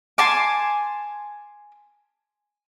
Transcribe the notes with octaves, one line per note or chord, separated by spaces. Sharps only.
G#5 A5 C6 D6